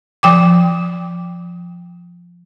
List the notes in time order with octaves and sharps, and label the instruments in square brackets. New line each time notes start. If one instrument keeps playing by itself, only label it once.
[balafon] F3 G5 D6